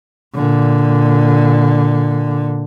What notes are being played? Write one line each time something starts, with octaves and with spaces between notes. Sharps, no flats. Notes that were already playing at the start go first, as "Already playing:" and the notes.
A#2 D3